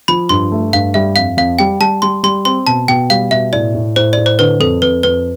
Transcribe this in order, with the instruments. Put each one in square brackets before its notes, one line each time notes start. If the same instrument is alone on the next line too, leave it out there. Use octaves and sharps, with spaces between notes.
[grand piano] F3 [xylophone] B5
[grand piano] G2 [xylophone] C6
[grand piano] A3
[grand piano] G2 [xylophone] F5
[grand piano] G3 [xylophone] E5
[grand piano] F2 [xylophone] F5
[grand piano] F2 [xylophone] F5
[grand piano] G3 [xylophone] G5
[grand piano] G3 [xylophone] A5
[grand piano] G3 [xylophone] C6
[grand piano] G3 [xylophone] C6
[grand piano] C4 [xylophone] C6
[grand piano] B2 [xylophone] A5
[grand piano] B2 [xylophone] G5
[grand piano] G3 [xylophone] F5
[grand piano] B2 [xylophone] E5
[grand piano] A2 [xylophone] D5
[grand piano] A2
[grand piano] A2 [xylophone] C5
[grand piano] A2 [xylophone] D5
[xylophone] C5
[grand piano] D3 [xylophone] B4
[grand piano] F2 [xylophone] A4
[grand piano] F2 [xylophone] B4
[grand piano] F2 [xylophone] B4